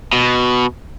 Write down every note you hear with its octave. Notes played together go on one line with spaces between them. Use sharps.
B2